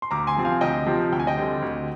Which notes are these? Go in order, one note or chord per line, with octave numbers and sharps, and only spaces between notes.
C6
D2 A#5 D6
G#5 C6
C3 F3 C4
F5 G#5
D2 D#5 G5
C3 F3 C4
D2 G5
G#5
D#5 G5
D3 G3 C4
D2